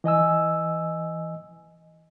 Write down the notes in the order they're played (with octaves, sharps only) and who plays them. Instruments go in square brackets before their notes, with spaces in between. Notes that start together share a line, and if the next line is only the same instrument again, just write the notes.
[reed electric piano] E3 D#5 G#5 E6